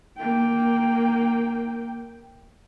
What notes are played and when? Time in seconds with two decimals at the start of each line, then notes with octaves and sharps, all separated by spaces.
0.18 A#3 G5